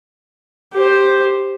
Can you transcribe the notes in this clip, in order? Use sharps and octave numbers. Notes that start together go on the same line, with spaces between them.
G4 C5